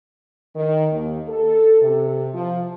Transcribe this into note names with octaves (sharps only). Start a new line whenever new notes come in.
D#3
D#2
A4
C3
F3